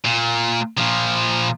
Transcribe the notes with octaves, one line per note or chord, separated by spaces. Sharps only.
A#2
A#2 F3